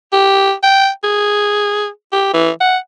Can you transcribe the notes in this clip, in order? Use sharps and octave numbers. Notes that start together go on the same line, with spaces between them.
G4
G5
G#4
G4
E3
F#5